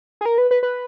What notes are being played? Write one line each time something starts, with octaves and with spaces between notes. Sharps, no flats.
G#4
A#4
B4
B4
B4